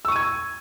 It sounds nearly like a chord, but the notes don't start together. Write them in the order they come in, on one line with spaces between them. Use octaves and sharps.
E6 C#6 D#7 G#6